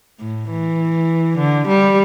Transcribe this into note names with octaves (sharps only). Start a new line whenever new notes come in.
A2
E3
D3
G3